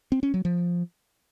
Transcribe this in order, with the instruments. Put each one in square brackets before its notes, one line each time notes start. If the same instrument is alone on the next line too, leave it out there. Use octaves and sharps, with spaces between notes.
[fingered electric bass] C4
C#4
F#3
F3